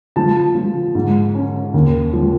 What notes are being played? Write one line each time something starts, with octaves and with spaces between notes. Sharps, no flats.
F3 A5
F3
G#2
C#4
D#2
F3